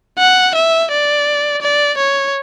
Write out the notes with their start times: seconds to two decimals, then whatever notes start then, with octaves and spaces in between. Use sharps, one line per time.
0.19 F#5
0.55 E5
0.91 D5
1.62 D5
1.98 C#5